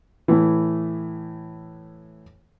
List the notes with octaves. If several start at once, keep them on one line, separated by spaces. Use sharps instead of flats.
A2 E3